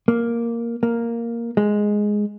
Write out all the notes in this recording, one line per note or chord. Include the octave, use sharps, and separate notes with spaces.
A#3
A#3
G#3